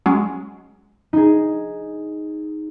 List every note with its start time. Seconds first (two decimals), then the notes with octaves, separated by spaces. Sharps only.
0.06 F#3 G#3 C#4
1.13 D#4 G#4